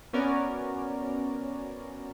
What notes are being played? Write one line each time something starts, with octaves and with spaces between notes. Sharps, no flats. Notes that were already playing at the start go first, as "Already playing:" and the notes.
B3 C#4 F#4 A#4 C#5 D5